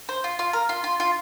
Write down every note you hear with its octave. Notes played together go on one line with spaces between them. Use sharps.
C5
F4
F4
A#4
F4
F4
F4